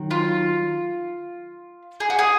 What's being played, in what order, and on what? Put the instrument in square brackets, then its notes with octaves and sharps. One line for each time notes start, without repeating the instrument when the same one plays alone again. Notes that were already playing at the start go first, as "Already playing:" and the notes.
Already playing: [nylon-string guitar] D#3 F#3
[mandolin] F4
G#4
F#4
G#4